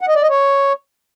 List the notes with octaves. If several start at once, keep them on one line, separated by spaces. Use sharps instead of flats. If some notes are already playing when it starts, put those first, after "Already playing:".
F#5
D#5
D5
D#5
C#5